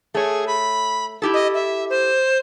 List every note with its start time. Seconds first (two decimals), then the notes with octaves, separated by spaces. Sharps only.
0.14 A3 G#4 C#5
0.47 B5
1.22 E4 G4 A4
1.34 D#5
1.54 E5
1.90 C5